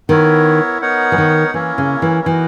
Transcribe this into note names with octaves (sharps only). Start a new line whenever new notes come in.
D#3 B3 E4 A#4 C#5
B3 D#4 A#4 C#5 F#5
E3
D#3
E3 A#3 C#4 E4 A#4 C#5
C#3
E3
E3 B3 D#4 F#4 A#4